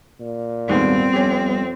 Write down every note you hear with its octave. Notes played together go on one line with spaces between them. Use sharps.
A#2
D#2 G#2 G3 B3 C4
F2 C#4 G4